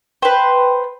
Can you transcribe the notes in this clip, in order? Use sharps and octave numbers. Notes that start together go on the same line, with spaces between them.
B4 C5 G5